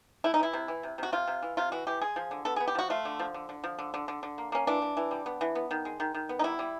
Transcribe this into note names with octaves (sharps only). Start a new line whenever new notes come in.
A3 E4
D#4
E3 E4
C3
E3
C3
C3 F#4
C3 F4
C3
E3
C3 F4
E3 F#4
E3 G4
G#3 G#4
F3
D3
B3 A4
B3 G#4
G4
F3 F#4
A3 F4
D3
F3
D3
D3
F3
D3
D3
D3
D3
A#3
A#3 C#4
E3 D4
E3
E3
G3
B3
E3
B3
D#3
G#3
D#3
D#3
B3
D#4
G3 E4
G3